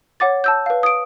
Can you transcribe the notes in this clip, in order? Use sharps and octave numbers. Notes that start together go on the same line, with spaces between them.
C#5 F#5 D6 A6
A5 E6 G6
B4 F5
D#6 D7